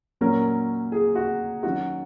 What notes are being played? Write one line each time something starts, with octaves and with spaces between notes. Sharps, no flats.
A#2 F#3 C#4 A#4
G#4
F#4
D#3 F#3 C#4 F#4